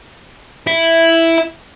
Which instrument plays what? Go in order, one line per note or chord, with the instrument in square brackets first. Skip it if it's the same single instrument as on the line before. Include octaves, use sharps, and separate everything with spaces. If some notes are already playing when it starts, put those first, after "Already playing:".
[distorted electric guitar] E4 E5